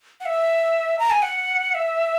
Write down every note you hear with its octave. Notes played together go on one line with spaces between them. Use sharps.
F#5
E5
A#5
G#5
F#5
E5